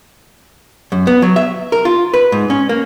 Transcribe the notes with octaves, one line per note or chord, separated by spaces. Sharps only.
F#2
B3
F#3
E5
A#4
F4
B4
G#2
C#4
A#3